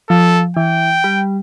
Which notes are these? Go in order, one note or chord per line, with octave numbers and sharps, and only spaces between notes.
F3 A4
E3 G5
G3